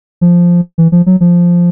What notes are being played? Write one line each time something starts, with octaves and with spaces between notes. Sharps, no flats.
F3
E3
F3
F#3
F3